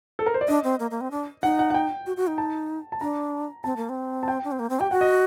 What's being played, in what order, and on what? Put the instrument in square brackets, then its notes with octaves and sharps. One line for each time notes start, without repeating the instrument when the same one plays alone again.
[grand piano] A4
A#4
C5
D5
[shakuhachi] D4 [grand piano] D#5
[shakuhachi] C4
A#3
A#3
C4
D4
[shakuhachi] D#4 [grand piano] F#5
[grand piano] F#5
F#5
G5
[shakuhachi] F#4
F#4
D#4
[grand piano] A5
A5
[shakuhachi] D4 [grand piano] A#5
[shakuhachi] C4 [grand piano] A5
[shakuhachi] A#3
C4
[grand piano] A5
G5
[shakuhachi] D4
C4
A#3
C4
[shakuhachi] G4 [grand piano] G5
[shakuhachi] F#4 [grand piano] F#5
[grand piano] D#5